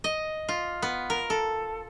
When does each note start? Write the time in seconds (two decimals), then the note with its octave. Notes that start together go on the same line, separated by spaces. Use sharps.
0.04 D#5
0.49 F4
0.82 B3
1.10 A#4
1.30 A4